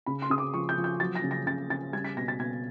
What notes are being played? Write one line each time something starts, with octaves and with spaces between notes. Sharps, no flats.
C#3 B5
C6
C#3 D#6
D6
F3 C#6
G6
F3
G6
F#3 A6
A#6
C#3
A#6
C#3 A6
C#3 A6
G3 G#6
B6
B2 A#6
A6
B2 G#6